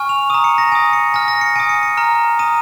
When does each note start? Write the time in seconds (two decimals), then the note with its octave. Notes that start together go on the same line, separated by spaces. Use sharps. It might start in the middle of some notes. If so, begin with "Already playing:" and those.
Already playing: G#5 C#6 F6
0.09 F7
0.30 D#6 D#7
0.34 A#5
0.44 C#7
0.58 A#6
0.72 G#5 D#7
0.75 D#6
0.93 C#7
1.14 G#5 F6 A#6
1.28 A#6
1.41 C#7
1.56 G#5 D#7
1.60 D#6
1.69 C#7
1.83 C#7
1.97 A#5 F6
2.39 A#5 D#6 D#7